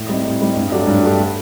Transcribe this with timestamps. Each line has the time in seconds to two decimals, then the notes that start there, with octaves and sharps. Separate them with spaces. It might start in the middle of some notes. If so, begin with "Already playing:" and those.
Already playing: A2
0.09 G3 C4 D#4
0.25 A2
0.41 G3 C4 D#4
0.56 G2
0.72 F#3 A3 D4 G4
0.87 G2
1.03 F#3 A3 D4 G4